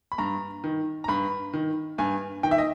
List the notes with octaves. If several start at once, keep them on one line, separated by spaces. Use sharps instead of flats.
B5
G2 A#5
D#3
A#5
G2 B5
D#3
G2 G#5
D#3 G5
E5
D#5